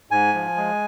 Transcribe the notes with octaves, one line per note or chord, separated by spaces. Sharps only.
G#2 G#5
F3
G#3